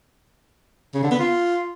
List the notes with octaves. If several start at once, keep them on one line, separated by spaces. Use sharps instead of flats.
C#3
D3
B3
F4